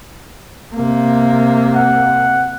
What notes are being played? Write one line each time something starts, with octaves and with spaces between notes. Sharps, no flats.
C3 A#3
F#5